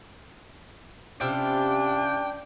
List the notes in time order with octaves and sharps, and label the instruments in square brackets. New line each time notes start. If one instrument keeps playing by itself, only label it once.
[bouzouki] C3 E4 F4 [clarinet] C#4 [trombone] D4 [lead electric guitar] G5